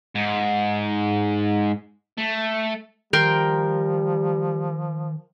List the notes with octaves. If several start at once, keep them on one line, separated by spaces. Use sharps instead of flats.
G#2
A3
D#3 F3 G3 A#4 G5 C6